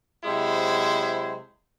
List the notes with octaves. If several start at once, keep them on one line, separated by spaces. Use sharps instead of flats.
C3 F#3 G#3 E4 C5